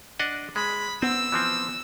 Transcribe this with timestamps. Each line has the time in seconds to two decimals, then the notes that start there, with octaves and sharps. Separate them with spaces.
0.19 D4 D#5 F#5
0.56 G#3 B5
1.02 B3 C4 E6
1.32 E3 F3 C4